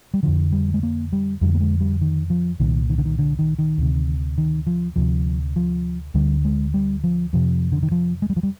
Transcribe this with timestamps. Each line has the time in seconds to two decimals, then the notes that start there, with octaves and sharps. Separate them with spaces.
0.14 G3
0.23 F2 D3 F3
0.52 G3
0.74 G#3
0.83 A#3
1.13 G3
1.41 F2 D3 G3
1.54 A#3
1.61 G#3
1.80 G3
2.01 D#3
2.30 F3
2.60 C2 A#2 D#3
2.90 D#3
2.98 D3
3.05 D#3
3.19 D3
3.39 D#3
3.59 D#3
3.78 D2 C3
4.38 D#3
4.67 F3
4.96 D2 C3 F3
5.56 F3
6.14 D2 D3 G3
6.45 G#3
6.74 G3
7.04 F3
7.33 F2 C3 F3
7.72 D3
7.83 D#3
7.92 F3
8.22 G#3
8.30 G3
8.37 F3
8.43 G3